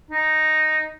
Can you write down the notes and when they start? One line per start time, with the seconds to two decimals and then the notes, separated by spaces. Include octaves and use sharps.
0.11 D#4